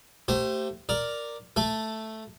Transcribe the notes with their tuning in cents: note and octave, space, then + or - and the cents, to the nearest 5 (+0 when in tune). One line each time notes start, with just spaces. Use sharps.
A3 +20 G4 -20 C5 +0
A#4 +0 D5 +0
A3 +0 A4 +0